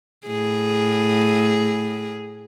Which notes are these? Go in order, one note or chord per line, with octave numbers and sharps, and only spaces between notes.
A2 G#4